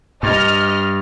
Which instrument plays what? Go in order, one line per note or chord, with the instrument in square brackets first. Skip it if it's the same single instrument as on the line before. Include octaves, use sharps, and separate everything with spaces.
[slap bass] G2 [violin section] D#5 F6